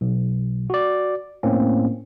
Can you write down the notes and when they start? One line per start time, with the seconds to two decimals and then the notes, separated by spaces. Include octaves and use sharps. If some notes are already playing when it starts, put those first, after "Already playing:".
0.01 B1
0.70 F#4 D5
1.43 A2 A#3 C4 C#4